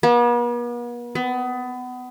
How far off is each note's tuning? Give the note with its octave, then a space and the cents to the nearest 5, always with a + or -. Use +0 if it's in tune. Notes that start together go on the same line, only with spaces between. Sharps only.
B3 -45
B3 +25